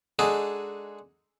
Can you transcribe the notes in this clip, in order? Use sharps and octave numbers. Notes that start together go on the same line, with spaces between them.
G#3 D4 D#4 F#4 G#4 A4